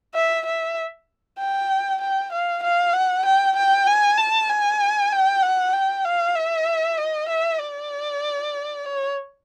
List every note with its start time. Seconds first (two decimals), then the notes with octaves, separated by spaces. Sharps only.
0.14 E5
0.45 E5
1.38 G5
2.01 G5
2.32 F5
2.63 F5
2.93 F#5
3.25 G5
3.56 G5
3.86 G#5
4.18 A5
4.49 G#5
5.12 G5
5.42 F#5
5.73 G5
6.04 F5
6.35 E5
6.98 D#5
7.28 E5
7.60 D5
8.85 C#5